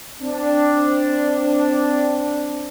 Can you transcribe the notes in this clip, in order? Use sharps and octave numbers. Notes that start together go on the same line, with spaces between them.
C4 D4